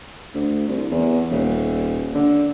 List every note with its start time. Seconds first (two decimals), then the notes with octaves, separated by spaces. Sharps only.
0.34 D2
0.68 C2
0.91 E2
1.31 D#1
2.14 D3